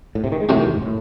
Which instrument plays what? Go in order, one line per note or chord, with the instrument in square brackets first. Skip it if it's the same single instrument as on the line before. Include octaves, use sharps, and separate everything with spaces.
[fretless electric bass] A2
C3
D#3
G#3
[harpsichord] C2 C3 E3 A3 C4 [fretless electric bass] F#3
[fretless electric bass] D#3
E2
G#2
A2